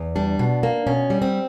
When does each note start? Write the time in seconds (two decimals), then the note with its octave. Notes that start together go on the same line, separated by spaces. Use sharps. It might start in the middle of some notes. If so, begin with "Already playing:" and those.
Already playing: E2
0.16 G3 D4
0.39 B2
0.63 A#3
0.87 B2 C#4
1.10 G3
1.22 C4